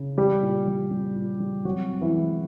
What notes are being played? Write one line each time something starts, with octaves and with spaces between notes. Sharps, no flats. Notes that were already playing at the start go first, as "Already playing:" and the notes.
Already playing: C#3
G3 G4
A#2
G3
G3
A#2
G3
C3 F#3 F#4
C3
E3 E4
G#3